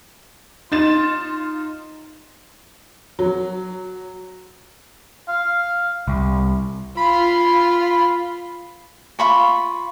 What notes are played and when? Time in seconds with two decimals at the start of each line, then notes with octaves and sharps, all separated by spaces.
0.72 D#4 F4 A6 E7
3.19 F#3
5.28 F5
6.08 C2
6.97 F4 B5
9.19 F4 B5 C#6